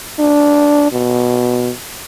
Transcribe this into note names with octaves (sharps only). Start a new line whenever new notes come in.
D4
B2